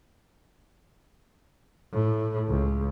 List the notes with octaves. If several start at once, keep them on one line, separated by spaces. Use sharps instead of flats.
A2
C#2